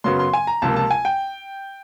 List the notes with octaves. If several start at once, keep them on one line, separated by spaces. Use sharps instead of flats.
F#2 C#3 F#3 B3 C6
C6
G#5
A#5
C#2 C3 F3 A#3 A5
A5
G#5
G5